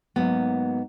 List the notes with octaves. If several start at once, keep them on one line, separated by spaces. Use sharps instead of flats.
G#2 F#3 A#3 B3